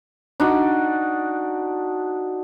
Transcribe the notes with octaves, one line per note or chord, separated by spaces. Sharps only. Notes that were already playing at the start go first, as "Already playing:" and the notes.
D4 D#4 F#4